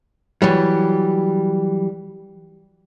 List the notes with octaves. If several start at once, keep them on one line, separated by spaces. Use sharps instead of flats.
E3 F#3 G3